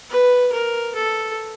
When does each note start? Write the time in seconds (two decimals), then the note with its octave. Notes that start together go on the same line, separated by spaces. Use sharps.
0.10 B4
0.52 A#4
0.95 A4